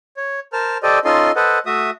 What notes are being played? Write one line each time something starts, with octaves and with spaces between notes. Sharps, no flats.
C#5
A#4 C5 A5 F6
G4 A4 C5 D5 D#5
C#4 D#4 F4 A4 D#5 C6
A4 B4 C5 D#5 F#5
A3 F#4 E5 D#6